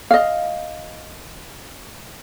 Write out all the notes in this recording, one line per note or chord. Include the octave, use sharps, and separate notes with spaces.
D#5 F5